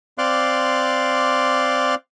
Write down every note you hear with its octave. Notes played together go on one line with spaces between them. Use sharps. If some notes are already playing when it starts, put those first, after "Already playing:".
C4 D5 F5 C6 D6 F#6